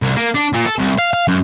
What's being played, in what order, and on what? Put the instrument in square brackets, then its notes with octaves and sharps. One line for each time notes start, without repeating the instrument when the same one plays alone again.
[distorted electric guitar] C2
A#3
D4
A#2
A4
C2
F5
F5
F#2